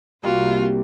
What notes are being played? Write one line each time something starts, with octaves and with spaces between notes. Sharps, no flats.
C2 G3 A#3 F4 F#4